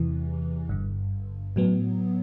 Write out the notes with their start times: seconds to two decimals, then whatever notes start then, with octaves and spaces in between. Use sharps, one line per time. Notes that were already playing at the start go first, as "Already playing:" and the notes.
Already playing: E2 C3 E3
0.68 G1 G2 D3
1.56 A2 F#3 B3